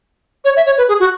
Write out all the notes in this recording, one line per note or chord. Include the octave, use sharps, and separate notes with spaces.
C#5
E5
C#5
B4
G#4
F#4